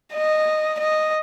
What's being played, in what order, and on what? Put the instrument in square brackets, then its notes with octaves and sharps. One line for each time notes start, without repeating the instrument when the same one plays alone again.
[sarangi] D#5
D#5